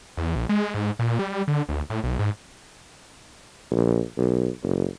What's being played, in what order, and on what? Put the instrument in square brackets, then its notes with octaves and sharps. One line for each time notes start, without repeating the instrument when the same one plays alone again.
[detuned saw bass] E2
A#1
G#3
G#2
A#2
G3
D3
D2
A2
B1
G#2
[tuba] A#1
B1
F#1